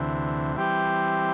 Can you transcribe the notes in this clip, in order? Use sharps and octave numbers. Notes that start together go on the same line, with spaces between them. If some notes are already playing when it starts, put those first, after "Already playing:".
Already playing: D2 C3 E3
E3 G3 C4 G4